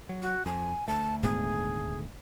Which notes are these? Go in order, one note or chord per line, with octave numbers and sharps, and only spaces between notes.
F#3
F#4
F2 G#5
D2 A3 A5
D#1 G#2 B3 G#4